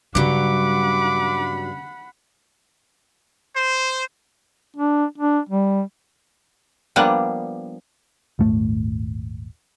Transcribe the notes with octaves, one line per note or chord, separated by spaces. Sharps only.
G2 C#3 F#3 F#5 B5 D6
C5
D4
D4
G3
F3 G3 A#3 B3 D4
D#1 G#1 A3